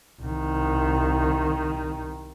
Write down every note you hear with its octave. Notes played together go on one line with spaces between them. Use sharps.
C2 D#3